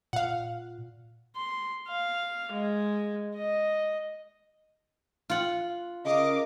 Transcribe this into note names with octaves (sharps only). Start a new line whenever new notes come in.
A#2 F5 F#5
C6
F5
G#3
D#5
F4 F#5
C#3 A#4 D#5 F5 D6